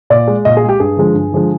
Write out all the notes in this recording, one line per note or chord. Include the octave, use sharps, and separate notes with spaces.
A#2 D5
G#3
A#2 D#5
G#4
G#3
G4
G2 G#4
D3 F3 G#3
G2
D3 F3 G#3